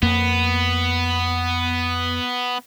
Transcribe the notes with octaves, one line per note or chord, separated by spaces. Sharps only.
F2 A#3 B3